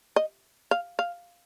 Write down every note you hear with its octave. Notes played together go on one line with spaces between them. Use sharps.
D#5
F5
F5